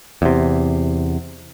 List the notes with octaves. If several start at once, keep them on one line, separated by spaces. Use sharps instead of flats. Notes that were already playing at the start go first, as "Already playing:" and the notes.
E2 C3